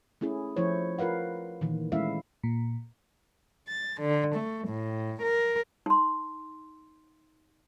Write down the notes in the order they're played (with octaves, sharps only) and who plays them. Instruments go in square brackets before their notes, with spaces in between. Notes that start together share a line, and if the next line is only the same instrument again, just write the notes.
[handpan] A3 C#4 E4 G#4
F3 A3 E4 C5 C#5
F4 A#4 B4 F5 F#5
A#2 D#3 E3
G#3 A3 C#4 E4 E5 F5
[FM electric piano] A#2
[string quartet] A6
D3
A3
A2
A#4
[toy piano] D#4 C6